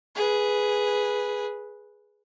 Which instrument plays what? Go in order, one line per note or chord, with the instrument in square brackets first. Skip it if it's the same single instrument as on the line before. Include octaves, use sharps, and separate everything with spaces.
[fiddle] G#4 B4